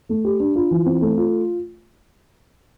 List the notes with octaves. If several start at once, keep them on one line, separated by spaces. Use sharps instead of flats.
A3
G4
D4
F4
E3
C4
A3
F4